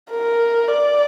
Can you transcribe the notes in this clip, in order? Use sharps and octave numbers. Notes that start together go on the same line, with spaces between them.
A#4
D5